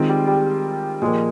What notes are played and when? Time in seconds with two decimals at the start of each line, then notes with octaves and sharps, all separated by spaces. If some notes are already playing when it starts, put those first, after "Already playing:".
Already playing: D#3 G#3 C4 F4
0.09 G3
0.27 G3
1.02 A#2 F3 G#3 A#3